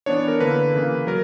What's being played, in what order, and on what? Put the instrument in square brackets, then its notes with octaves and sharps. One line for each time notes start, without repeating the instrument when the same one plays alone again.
[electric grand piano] E3 B3 D4 C#5
A#4
D3 A#3 E4 B4
C#3 E3 A#3
F#3 A#4